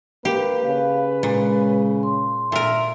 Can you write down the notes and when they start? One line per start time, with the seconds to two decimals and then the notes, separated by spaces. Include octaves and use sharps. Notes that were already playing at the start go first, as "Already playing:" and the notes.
0.25 A#3 G4 B4
0.64 C#3 F5
1.23 A#2 G#3
2.03 C6
2.52 A#2 A#4 E5